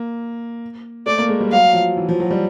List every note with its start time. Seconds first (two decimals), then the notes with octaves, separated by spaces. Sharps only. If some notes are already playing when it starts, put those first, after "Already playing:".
Already playing: A#3
1.06 A3 D5
1.19 A#3
1.29 G#3
1.40 G3
1.52 F#3 F5
1.74 F3
1.97 E3
2.09 F3
2.20 F#3
2.31 G3